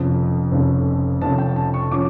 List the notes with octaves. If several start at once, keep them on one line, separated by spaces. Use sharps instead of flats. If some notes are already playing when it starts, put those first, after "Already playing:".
Already playing: F1 F2 C#3 F3 C#4
F1 F2 C#3 F3 C#4
F1 F2 C#3 F3 C#4 A5
G5
A5
C#6
C#3 F3 C#4 D6